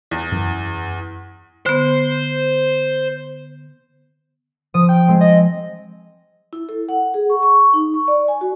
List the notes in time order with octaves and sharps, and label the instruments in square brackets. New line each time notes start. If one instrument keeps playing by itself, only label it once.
[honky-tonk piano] E2
[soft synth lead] F#2
[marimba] D3 B3 [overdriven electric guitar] C5
[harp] F3 [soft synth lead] D#6
[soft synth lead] G5
[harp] G#3 C4
[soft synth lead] D#5
[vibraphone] E4
A4
F#5
G#4
C#6
C#6
D#4
C#6
D5
G#5
F#4